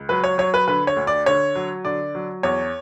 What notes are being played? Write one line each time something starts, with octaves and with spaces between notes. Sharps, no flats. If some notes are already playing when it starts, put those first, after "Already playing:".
Already playing: C#2
F#3 B4
C#5
F#3 C#5
B4
D3 B4
C#5
D2
D5
D3 C#5
F#3
D3 D5
F#3
E2 C#5